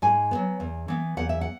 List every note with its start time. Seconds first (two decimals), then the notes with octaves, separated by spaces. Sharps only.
0.02 G#2 G#5
0.31 F#3 B3
0.60 E2
0.88 E3 B3
1.17 E2 F#5
1.29 E5
1.41 F#5